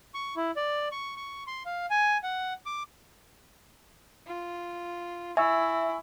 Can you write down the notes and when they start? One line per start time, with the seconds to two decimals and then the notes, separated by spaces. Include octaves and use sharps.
0.14 C#6
0.36 E4
0.56 D5
0.92 C#6
1.17 C#6
1.47 C6
1.65 F5
1.90 G#5
2.23 F#5
2.66 D6
4.27 F4
5.37 E4 E5 G#5 C#6 E6